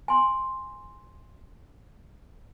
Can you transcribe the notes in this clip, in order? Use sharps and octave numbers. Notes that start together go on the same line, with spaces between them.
G#5 C6